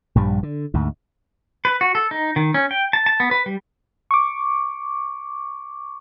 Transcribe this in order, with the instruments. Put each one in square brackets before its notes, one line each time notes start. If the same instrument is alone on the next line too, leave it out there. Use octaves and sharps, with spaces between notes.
[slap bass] A#1 G2 G3
D3
D2 G#2
[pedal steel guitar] B4
F#4
A4
D#4
D#3
C#4
G5
A5
A5
B3
B4
G3
[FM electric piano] C#6 D6